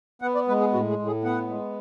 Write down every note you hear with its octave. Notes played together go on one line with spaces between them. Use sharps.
B3 F#5
D5
G#3 B4
G#4
A2 F#4
G#4
A2
G#4
B3 F#5
G#3